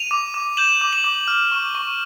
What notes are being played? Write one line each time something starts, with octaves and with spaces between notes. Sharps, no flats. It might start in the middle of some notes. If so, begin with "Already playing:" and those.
Already playing: D#7 F7
D6
D6
G6 E7 F#7
D6
E7 F#7
D6
F6
C#6
C#6